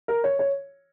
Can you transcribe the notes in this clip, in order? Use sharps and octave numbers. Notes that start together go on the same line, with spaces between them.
A#4
C#5
C#5